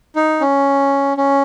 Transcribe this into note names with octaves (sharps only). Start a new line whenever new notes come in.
D#4
C#4
C#4